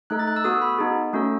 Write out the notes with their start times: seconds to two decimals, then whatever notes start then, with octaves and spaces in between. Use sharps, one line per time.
0.10 A3 D#4 A4 F#6
0.19 A6
0.27 F#6
0.36 E6
0.44 B3 F#4 A4 D#6
0.62 B5
0.78 B3 D#4 G#4
1.13 A3 C#4 F#4 A4